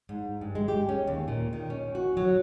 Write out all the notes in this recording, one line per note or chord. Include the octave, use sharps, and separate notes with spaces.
G#2
G2
G#3
G4
C#4
D#2
A#2
D#3
C#4
F#4
F#3